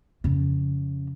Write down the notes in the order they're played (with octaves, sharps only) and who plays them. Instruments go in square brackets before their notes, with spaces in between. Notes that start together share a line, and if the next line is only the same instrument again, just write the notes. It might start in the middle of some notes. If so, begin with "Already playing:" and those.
[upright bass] F2 C#3